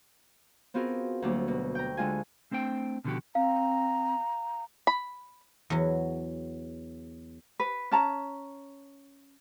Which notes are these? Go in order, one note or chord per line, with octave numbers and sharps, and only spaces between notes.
B3 C4 F4 F#4 G#4 A#4
D2 F#3 G3 A#3 D4
B2
G5 A#5
D3 G#3 F4 G#5
A3 C4 D4 C5 G5
B2 D3 D#3 F3 F#4 G4
C4 F5 A#5
B5
E2 F#3
B4
C#4 A5 A#5